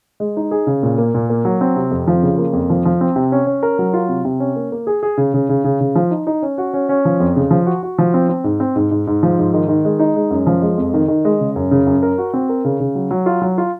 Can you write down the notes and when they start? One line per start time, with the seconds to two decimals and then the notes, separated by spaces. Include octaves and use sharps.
0.20 G#3
0.37 D#4
0.51 G#4
0.67 C#3
0.83 A#2
0.98 A#3
1.14 A#2
1.30 A#3
1.45 F#3
1.61 C4
1.76 C3
1.91 F2
2.08 F3
2.23 C#3
2.38 A#3
2.53 F2
2.70 F3
2.85 F3
3.01 C4
3.16 C3
3.32 C#4
3.47 C#4
3.63 A#4
3.79 F#3
3.93 F4
4.09 C3
4.25 C3
4.40 C#4
4.56 A#3
4.72 A#3
4.87 G#4
5.03 G#4
5.17 C#3
5.34 C#3
5.49 C#3
5.64 C#3
5.81 C#3
5.96 F3
6.11 D#4
6.27 D#4
6.42 C#4
6.58 F#4
6.73 C#4
6.89 C#4
7.05 F3
7.20 F2
7.36 C#3
7.51 F3
7.66 F#4
7.83 F#4
7.98 F3
8.14 C4
8.29 C4
8.44 G#2
8.60 C4
8.76 G#2
8.91 G#2
9.07 G#2
9.23 F3
9.38 G#2
9.54 D#3
9.69 D#3
9.85 G#3
9.99 D#4
10.16 G#3
10.31 F#2
10.47 F3
10.62 G#3
10.78 F2
10.94 D#3
11.08 D#3
11.25 G#3
11.40 C#3
11.56 F#2
11.71 C#3
11.87 F#2
12.03 A#4
12.18 F#4
12.34 C4
12.49 A#4
12.65 C#3
12.80 C#3
12.95 F#3
13.11 F#3
13.26 F4
13.42 F#3
13.58 F4